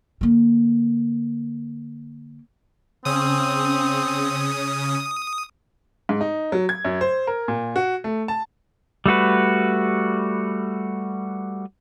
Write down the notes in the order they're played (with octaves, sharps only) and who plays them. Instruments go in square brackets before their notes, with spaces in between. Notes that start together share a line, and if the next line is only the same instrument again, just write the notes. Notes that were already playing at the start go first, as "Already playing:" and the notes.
[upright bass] D3 A#3
[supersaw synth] C#3 C#4 [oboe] C4 [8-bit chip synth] D#6
[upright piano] G#2
D#4
F#3
G#6
F#2
C5
A#4
A#2
F#4
A3
A5
[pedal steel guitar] G3 A3 F#4 B4